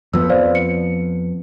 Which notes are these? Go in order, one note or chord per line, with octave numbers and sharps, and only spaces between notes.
F2 F3 B3 E6
C5 D5 F5
C#7